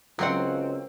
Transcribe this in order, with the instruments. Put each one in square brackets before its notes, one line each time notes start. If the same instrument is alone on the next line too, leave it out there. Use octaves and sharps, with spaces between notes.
[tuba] C#2 [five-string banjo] F#3 F#5 [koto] A#3 C4